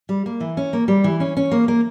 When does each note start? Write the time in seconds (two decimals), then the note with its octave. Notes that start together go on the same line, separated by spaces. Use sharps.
0.09 G3
0.26 A#3
0.40 E3
0.57 C#4
0.73 A#3
0.88 G3
1.04 E3
1.20 C#4
1.37 C#4
1.51 A#3
1.68 A#3